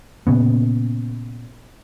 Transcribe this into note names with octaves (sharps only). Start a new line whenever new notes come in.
A#2 C#3 B3